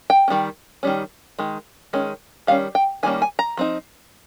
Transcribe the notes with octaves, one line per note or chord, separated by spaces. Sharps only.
G5
C#4
D#3 G3
D#3 G3 C#4
D#3 G#3
D#3 G#3 C#4
D#3 G3 C#4 F5
G5
D#3 G3 A#3 C#4 G#5
G#5
A#5
F3 C4 D#4